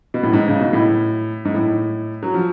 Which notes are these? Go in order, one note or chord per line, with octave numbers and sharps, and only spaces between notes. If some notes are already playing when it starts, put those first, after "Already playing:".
B2
A2
G#2
C#3
B2
A2
G#2
A2
F#3
F3